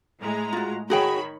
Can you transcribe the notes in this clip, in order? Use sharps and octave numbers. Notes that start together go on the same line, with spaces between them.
A2 G#3 A#5
F4 F#4
D#3 F#4 G#4 C#5 G5 B5